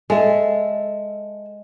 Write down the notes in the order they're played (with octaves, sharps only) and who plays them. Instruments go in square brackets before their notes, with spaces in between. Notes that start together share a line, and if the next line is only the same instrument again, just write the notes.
[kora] G#3 [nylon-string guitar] A4 E5